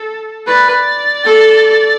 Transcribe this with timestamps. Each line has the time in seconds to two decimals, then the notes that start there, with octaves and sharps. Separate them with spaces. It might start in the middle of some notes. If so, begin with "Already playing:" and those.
Already playing: A4
0.47 B4 D5
1.25 A4